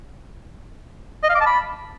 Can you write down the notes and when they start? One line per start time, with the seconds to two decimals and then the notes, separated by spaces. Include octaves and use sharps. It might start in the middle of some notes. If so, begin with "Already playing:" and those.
1.23 D#5
1.29 F5
1.35 D6
1.41 A5
1.47 B5